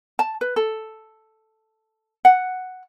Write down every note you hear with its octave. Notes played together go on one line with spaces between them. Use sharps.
A5
B4
A4
F#5